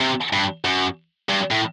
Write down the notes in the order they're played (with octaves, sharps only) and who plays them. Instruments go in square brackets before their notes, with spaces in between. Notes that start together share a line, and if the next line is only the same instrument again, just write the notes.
[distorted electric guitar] C3
G2
F#2
G2
A2